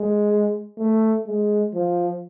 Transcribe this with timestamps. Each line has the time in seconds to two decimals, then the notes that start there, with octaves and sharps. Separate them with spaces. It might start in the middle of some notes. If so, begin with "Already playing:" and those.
Already playing: G#3
0.79 A3
1.27 G#3
1.74 F3